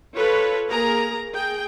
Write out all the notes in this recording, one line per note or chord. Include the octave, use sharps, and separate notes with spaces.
F4 A4 B4 C#5
A#3 G#4 A#4 A#5
G#4 G5